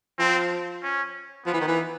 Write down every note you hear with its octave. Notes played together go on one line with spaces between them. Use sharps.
F3 C4
C#4
F3 B3
E3
D#3
E3